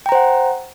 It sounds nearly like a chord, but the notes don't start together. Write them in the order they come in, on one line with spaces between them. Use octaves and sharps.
G5 A#5 C5 F#5